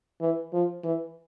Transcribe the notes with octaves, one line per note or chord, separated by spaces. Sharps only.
E3
F3
E3